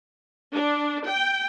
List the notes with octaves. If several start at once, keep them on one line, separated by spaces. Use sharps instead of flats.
D4
G5